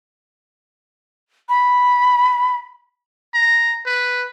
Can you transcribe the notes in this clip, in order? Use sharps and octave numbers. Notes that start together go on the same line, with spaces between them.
B5
A#5
B4